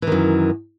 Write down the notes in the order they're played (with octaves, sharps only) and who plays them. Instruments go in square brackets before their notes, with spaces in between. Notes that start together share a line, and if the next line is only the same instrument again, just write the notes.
[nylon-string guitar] E3
D#3
F#2